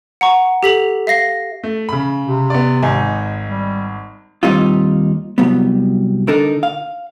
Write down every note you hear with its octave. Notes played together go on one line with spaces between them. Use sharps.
F#5 A#5 C#6
G4 A4 B6 F7 F#7
E5 F5 A#6 C7
A3
C#3 B5
C3
B3 D5
G#1 D#4 G#5
G3
D#2 G3 C4 D#4 F4
C2 F#3 G3 B3
D3 D4 D#4 A4 A#4
F5